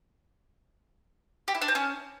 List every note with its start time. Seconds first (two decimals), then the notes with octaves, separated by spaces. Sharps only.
1.48 G4
1.55 E4
1.61 D4
1.68 C4
1.75 C#4